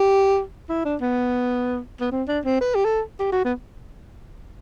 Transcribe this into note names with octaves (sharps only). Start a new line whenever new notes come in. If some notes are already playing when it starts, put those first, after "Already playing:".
Already playing: G4
E4
D4
B3
B3
C4
D4
C4
B4
G4
A4
G4
F#4
B3